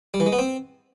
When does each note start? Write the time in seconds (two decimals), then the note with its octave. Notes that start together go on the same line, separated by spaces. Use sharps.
0.14 G3
0.20 E3
0.26 G#3
0.32 B3
0.39 C4